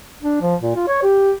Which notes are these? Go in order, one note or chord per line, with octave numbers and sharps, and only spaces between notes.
D4
F3
A#2
F4
C#5
G4